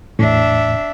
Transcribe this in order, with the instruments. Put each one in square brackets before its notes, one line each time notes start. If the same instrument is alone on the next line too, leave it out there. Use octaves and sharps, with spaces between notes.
[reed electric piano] E2 A2 [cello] D4 E5